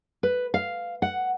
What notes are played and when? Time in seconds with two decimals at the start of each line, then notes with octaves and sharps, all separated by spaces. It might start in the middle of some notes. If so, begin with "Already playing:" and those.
0.23 B4
0.54 F5
1.02 F#5